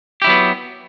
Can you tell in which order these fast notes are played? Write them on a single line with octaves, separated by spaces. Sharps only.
G4 E4 F#3 B3